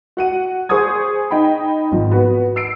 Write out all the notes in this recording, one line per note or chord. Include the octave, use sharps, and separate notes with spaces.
F#4 F#5 D#7
G#4 C5 C#6 D#6 G#6
D#4 G5 B5
G#1 F3
B3 F#4 B4
E6 C7 D7